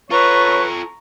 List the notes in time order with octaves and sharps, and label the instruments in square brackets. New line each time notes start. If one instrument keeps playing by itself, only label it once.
[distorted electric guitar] F4 A4 [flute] B4 [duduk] C#5 [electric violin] A#5 C#6